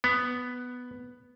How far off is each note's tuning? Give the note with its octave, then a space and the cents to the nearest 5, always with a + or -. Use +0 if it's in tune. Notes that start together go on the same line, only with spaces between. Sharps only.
B3 +5